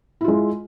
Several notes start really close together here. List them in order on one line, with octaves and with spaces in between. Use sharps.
E4 F4 G#3